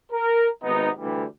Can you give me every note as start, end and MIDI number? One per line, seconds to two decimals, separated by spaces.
0.12 0.48 70
0.64 0.90 32
0.64 0.90 48
0.64 0.90 59
0.64 0.90 63
0.98 1.24 38
0.98 1.24 50
0.98 1.24 52
0.98 1.24 55